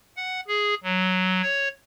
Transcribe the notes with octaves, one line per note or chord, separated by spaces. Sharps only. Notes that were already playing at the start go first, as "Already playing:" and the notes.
F#5
G#4
F#3
C#5